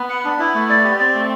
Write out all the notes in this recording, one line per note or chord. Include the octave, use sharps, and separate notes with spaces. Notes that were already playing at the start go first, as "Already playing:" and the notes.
Already playing: B3
F#5
D4
B3 E4
A3
D5
G4
C4 D5
A3